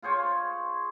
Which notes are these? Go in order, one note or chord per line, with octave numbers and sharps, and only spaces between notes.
F4 G#4 C5 C#5